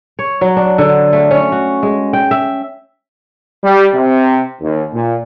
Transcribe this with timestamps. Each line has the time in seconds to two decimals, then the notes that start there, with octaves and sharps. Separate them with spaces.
0.19 C#5
0.41 F#3
0.57 D4
0.78 D3
1.13 A3
1.31 C#4
1.52 F#4
1.83 G#3
2.13 G5
2.31 E5
3.64 G3
3.94 C3
4.61 D#2
4.94 A#2